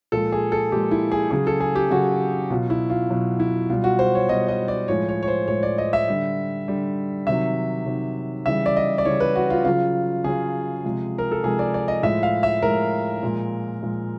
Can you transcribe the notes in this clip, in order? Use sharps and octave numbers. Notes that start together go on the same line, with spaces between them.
A#2 F3 G#3 A4
G#4
A4
A#2 F3 G#3 G4
E4
G#4
C#3 F#3 G#4
A4
G#4
G4
C#3 F#3 F#4
B2 F#3 F4
E4
F4
B2 F#3
E4
B2 G3 F4
F#4
C5
C#5
B2 G3 D#5
D#5
D5
A2 F3 G#3 C#5
C#5
C#5
C5
A2 F3 G#3 C#5
D5
D#5
E5
D3 G3
D3 G3
C3 D#3 F#3 E5
C3 D#3 F#3
C#3 E3 G3 E5
D5
D#5
D5
C#3 E3 G3 C#5
B4
F#4
F4
C#3 F#3 F4
C#3 F#3 G#4
C3 F3 G#3
A#4
A4
C3 F3 G#3 G#4
D5
D5
D#5
A2 F3 G#3 E5
F5
E5
A2 F3 G#3 A#4
A#2 F3 G#3
A#2 F3 G#3